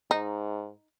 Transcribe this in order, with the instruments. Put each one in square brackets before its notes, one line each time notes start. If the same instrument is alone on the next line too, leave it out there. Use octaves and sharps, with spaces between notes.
[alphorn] G#2 [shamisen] D#4